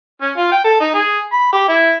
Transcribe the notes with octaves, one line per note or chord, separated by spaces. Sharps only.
C#4
F4
G5
A4
D#4
G#4
B5
G4
E4